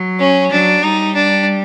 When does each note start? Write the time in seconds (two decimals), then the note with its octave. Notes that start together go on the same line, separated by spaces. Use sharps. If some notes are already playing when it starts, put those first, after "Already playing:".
Already playing: F#3
0.19 C#4
0.52 F#3 D4
0.84 G3 D#4
1.15 D4